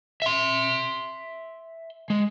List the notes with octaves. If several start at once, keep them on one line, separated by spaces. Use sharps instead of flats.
E5 C6
G#3